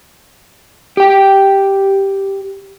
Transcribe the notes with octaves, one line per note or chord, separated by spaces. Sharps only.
G4 G5